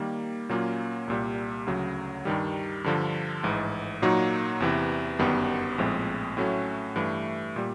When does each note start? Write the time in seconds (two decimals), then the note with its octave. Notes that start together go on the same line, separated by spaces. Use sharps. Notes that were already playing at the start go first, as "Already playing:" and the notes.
Already playing: D#3 G3 A#3
0.49 A#2 F#3 A#3 C#4 F4
1.07 C2 A#2 G3
1.66 D2 C#3 F#3
2.25 G2 D#3 G3
2.84 G2 D3 F3
3.43 A1 G#2 E3
4.02 A#2 F#3 A#3 D#4 F#4
4.60 E2 C3 E3
5.19 G1 F#2 D#3 G3 B3
5.78 A#1 A2 F3 G#3 C4
6.37 A2 F#3 A3 C#4 F#4
6.96 G2 E3 A3
7.56 A#2 G3